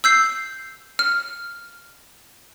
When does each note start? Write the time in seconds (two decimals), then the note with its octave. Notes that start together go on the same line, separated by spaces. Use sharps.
0.04 E6 G6 C7
0.99 F6